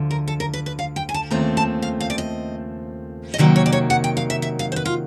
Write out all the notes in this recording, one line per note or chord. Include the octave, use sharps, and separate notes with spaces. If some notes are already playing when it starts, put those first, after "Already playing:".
Already playing: D2 D3 F3
A#4
A4
A#4
B4
B4
F5
G5
G#5
A5
D#2 C#3 F3 A3 C4 A#5
A5
F5
F5
D5
D#5
D#5
C3 D#3 F#3 A#3 D5
C#5
D5
C#5
F#5
G5
F5
E5
E5
F5
C5
B4
F4